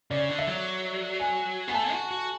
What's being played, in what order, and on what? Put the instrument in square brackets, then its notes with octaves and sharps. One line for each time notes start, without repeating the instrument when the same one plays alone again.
[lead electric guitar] C#3 [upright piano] D5
[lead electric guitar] D3
[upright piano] E5
[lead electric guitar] F#3
[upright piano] G#5
[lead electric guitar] B3 [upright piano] G#5
[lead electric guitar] A3 [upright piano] A5
[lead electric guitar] F#4
F#4